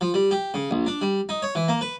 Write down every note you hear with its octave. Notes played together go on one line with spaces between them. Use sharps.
F3
G3
G4
C#3
A#1
D4
G3
D#4
C#5
E3
A#3
B4